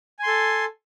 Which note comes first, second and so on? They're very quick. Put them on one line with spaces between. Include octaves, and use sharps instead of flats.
G#5 C6 A4